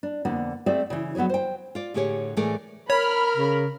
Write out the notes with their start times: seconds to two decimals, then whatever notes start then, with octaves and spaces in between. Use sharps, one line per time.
0.03 D4
0.25 F2 D3 A#3 B3 D4
0.66 A3 C4 G#4 D5 E5
0.90 C#3 E3
1.15 F#3 B3 D4 G#4 C#5
1.29 C5 G5
1.75 F4 D5
1.94 A2 D3 G4 G#4 C#5
2.37 A2 E3 A3 G#4 A#4 D5
2.90 A#4 C#5 B5 F6
3.37 C#3